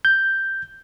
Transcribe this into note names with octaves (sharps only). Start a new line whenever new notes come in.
G6